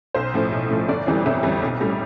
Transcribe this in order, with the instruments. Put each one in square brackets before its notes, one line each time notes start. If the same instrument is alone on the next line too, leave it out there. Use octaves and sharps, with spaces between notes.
[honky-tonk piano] B1 C5
A2 F3
B1
A2 F3
G1 D5
F2 E3 G3
G1 E5
F2 E3 G3
B1
A2 G3